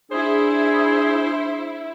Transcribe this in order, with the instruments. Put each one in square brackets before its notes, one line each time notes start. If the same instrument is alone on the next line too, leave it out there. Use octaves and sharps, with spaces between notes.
[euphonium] D4 [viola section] E4 [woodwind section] G#4 [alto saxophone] C5